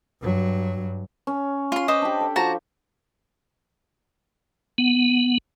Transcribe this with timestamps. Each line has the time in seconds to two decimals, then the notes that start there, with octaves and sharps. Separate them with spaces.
0.22 G2 F#3
1.27 C#4
1.72 F4 C6
1.88 B4 C5 D#5 D6
2.02 D4 G4
2.21 A4
2.36 F3 F#4 A5 A#5
4.78 B3